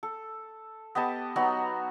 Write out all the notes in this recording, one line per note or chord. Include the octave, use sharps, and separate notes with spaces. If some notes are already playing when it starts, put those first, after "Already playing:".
A4
B3 G4 D#5 A5
F#3 B3 D#4 F#4